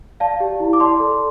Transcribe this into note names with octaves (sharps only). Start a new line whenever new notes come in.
D5 F5 A5
G4
E4
D6
D5 A5 C6
A4